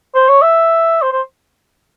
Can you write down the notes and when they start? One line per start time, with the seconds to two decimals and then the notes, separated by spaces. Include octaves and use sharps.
0.15 C5
0.29 C#5
0.42 E5
1.02 C5
1.12 C5